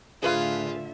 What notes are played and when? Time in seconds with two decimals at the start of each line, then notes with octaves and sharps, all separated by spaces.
0.23 A2 D3 F4 G#4 B4 E5 F5